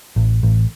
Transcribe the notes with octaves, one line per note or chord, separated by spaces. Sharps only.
A1
A1